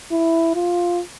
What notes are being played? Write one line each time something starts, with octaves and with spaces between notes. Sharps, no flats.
E4
F4